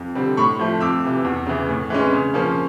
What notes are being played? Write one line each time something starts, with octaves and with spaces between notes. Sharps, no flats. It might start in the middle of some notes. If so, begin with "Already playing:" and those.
Already playing: F2
D3 G3 C4
A2 B5 C#6
F3 A3
F2 D6 E6
C3 E3
E2
C#3 E3
A2
E3 G#3 C#4
C#3
F3 A#3 C#4